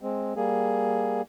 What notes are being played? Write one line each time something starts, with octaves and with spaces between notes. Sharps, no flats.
G#3 C4
G3 A#3 G#4